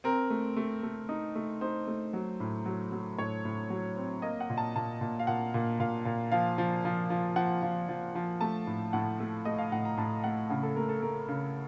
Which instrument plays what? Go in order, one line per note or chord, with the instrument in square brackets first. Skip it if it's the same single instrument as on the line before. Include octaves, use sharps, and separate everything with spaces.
[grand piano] C4 A#4
A3
A3
A3
D#4
A3
D#4 C5
A3
F#3
A2
F#3
F#3
A2 C#5
A2
F#3
C4
A#3 D#5
F#5
A#2
A5
A#2 A5
A#2
F5
A#2 F#5
A#2
A#2 F5
A#2
F3 F5
F3
F3
F3
F3 F#5
F3
F3
F3
A3 A5
A2
A2 F#5
A3
A3 D#5
F5
A2 F#5
A#5
A2 A5
A3 F#5
C#3 F#5
A4
A3 A#4
A4
A3 A#4
C#3